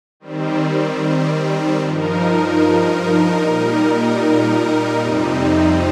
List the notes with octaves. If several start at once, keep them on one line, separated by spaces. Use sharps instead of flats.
D#3 G3 C4
G2 F3 D#4 A#4
A#2 G3 D#4 A#4
F2 C3 G3 C4 D#4